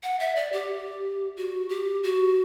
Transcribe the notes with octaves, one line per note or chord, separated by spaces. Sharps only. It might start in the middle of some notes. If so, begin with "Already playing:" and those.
F#5
E5
D5
G4
F#4
G4
F#4